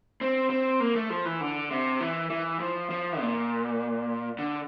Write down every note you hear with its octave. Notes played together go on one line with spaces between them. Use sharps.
C4
C4
A#3
A3
F3
E3
D3
C3
E3
E3
F3
F3
A#2
D3